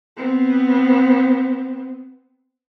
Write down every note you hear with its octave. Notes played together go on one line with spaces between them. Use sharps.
B3 C4